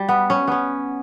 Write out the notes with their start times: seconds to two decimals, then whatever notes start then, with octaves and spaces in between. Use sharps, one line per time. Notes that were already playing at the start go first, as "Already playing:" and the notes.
Already playing: G3
0.09 B3
0.30 C#4
0.48 B3 C#4